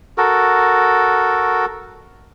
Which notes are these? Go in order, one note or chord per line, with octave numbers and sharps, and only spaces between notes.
F#4 A4 A#4